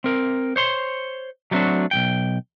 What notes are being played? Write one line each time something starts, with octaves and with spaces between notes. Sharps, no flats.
C4 A#4
C5 C#5 C6
F#3 G3 A3 C4 D4 F#4
B1 F#2 G5